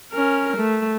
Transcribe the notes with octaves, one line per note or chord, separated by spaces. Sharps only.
C#4 A#4
A3